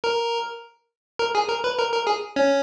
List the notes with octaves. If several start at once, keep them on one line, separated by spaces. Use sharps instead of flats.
A#4 A#5
A#4 A#5
G#4 G#5
A#4 A#5
B4 B5
A#4 A#5
A#4 A#5
G#4 G#5
C#4 C#5